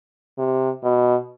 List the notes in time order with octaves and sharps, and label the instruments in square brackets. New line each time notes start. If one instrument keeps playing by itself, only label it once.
[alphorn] C3
B2